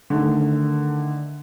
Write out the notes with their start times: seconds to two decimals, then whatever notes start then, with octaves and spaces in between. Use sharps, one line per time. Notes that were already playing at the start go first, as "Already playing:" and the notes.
0.10 D3 D#3 A3